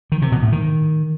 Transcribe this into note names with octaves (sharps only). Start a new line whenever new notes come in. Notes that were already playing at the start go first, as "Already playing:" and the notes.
D#3
C3
B2
A2
D#3